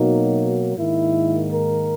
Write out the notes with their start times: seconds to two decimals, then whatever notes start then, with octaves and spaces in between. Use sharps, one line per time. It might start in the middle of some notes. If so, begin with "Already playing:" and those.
Already playing: B2 F#3 A#3 D#4
0.76 G#2 D#3 A#3 E4
1.51 A#4